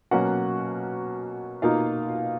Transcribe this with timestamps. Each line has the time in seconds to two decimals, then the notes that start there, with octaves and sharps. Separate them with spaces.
0.11 B2 F#3 A#3 C#4 F#4 F#5
1.62 B2 A#3 D#4 F4 F5